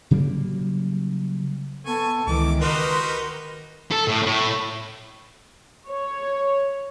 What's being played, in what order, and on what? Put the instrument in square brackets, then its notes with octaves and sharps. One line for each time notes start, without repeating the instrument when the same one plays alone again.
[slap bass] C#3 F#3 G3 A#3
[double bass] B3 [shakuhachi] A4 [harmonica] G#5 C#6
[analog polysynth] C#2 E3 [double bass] D#3 [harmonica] D6
[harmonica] D#4 F#4 G4 [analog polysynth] A#4 B4 [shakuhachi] C6
[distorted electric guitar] A4
A2
A2
[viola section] C#5